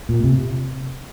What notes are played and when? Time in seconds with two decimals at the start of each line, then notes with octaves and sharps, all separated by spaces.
0.09 A#2
0.24 C3